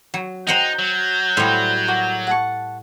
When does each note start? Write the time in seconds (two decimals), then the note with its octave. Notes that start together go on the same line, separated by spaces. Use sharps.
0.14 F#3
0.47 D#4 C5 F#5 G5 A#5 G6
0.79 F#3
1.37 A2 G3 C5 D5 F#5
1.88 F#4 A#4 D6
2.27 F#5 A5 C#6